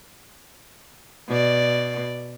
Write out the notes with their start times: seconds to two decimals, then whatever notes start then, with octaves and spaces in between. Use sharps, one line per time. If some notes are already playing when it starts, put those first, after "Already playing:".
1.28 B2 D5